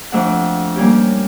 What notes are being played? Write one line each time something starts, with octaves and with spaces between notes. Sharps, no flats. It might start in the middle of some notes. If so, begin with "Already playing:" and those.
F2 A3 D4 F#5
G3 A#3 C#4 G4